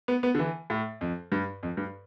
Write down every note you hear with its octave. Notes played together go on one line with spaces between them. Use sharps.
B3
B3
D3
E3
A2
F2
G2
F2
G2